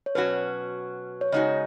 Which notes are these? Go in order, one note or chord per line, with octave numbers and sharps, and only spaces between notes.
C#5
B2 F#3 C#4 F#4 B4
C#5
C#3 G#3 D#4 F#4 D#5